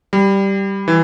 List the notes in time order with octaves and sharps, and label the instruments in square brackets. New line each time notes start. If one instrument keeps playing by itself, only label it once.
[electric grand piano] G3
E3